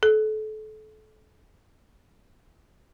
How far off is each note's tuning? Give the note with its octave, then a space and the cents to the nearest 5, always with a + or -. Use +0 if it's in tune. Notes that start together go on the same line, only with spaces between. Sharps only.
A4 -30